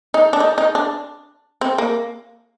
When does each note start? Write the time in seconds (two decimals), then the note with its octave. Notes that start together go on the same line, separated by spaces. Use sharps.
0.14 D#4
0.33 D4
0.40 D#4
0.58 D#4
0.75 D4
1.61 C4
1.78 A#3